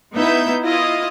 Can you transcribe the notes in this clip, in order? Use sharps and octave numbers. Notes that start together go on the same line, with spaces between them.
B3 D#4 E4 E5 G6
E4 F4 D#5 F5 D#6